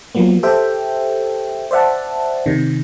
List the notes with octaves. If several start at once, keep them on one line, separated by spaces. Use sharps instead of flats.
F3 F#3 A#3 B3
G4 A4 C5 E5 G5
C5 D5 E5 F#5 A5
C3 D#3